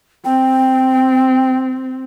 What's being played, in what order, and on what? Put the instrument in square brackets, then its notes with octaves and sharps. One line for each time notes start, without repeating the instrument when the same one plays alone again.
[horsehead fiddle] C4 [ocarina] G5